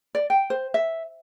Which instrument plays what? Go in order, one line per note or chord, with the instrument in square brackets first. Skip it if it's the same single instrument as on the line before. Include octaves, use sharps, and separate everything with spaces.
[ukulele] D5
G5
C5
E5